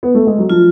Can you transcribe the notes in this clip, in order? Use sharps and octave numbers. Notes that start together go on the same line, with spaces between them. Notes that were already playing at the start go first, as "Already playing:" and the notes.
B3
A3
G#3
F#3
F3 F4